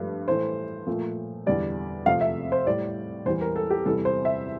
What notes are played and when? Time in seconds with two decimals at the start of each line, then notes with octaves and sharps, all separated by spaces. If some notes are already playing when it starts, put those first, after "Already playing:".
Already playing: G2 F3 A3
0.28 A2 E3 A3 C5
0.87 A#2 F3 A3
1.46 E2 D3 G3 D5
2.06 F2 C3 F3 A3 F5
2.21 E5
2.52 C5
2.66 A2 G3 D5
3.26 E2 E3 G3 C5
3.41 A#4
3.56 A4
3.70 G4
3.86 E2 C3 E3 G3 A4
4.05 C5
4.25 E5